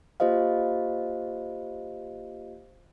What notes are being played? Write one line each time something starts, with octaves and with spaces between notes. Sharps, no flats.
A#3 F4 G4 C5 D#5 F5